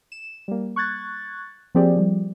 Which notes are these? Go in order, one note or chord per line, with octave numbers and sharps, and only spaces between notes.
E7
G3 A#3
C#6 F#6 G#6 A6
F3 A#3 C4 G4 G#4 D5
F3 G3